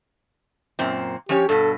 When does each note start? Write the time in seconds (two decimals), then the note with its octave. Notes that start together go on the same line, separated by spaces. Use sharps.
0.79 F#2 A#2 C4
1.29 F3 C#4 G4 C#5
1.49 G2 B2 A4